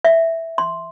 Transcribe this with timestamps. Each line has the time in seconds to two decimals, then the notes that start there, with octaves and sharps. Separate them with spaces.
0.05 E5
0.58 C6